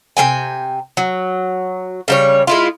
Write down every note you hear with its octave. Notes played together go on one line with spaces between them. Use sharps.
C3 A#3 G5 G#5
F#3
C#3 G3 C#5
G#3 E4 F4